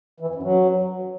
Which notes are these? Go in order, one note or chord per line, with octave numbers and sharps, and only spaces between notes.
E3
F2
F#2
F#3